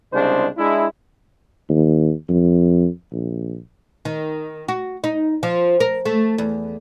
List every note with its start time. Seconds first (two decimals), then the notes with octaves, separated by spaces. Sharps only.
0.13 C2 C#3 G#3 D4 C5
0.57 G#3 D4 E4
1.69 D#2
2.29 F2
3.12 A#1
4.05 D#3
4.68 F#4
5.04 D#4
5.43 F3
5.80 A#4
6.05 A3
6.38 E2